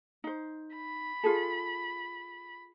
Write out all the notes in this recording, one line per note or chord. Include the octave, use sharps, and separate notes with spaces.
D#4 C5
B5
F4 G#4 A4